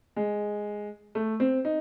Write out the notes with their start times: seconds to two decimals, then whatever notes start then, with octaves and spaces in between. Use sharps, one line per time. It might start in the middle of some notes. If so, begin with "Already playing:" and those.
0.16 G#3
1.15 A3
1.40 C4
1.65 D#4